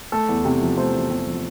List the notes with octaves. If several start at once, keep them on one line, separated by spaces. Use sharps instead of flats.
A3 A4
E2
C3
F3
A3 C5
E2
C3
F3